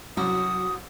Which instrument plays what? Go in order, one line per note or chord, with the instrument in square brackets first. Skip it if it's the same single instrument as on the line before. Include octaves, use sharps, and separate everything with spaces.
[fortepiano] C2 F#2 D6 [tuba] F#3 [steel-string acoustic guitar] F#4 [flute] D#6